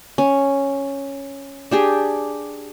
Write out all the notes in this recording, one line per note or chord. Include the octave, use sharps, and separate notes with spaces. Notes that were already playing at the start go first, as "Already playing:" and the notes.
C#4
D4 G4 G#4